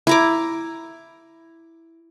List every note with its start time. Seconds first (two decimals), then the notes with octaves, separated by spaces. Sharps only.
0.07 E4 A#5 D6